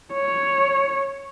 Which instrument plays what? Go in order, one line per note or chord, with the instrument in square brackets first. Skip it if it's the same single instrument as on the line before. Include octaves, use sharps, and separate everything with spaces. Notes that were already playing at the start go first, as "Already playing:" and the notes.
[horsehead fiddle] C#5